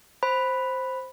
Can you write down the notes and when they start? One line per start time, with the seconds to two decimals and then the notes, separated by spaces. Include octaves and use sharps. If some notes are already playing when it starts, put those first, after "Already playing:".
0.23 C5 B5